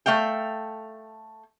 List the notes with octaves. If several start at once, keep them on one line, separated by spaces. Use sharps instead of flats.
A3 E5 F5 G5